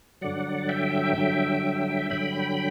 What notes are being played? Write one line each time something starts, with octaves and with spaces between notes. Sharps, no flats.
G2 D3 F#3 D5 F#5
E5 G5
G2 D3 F#3
G2 D3 F#3 G5 B5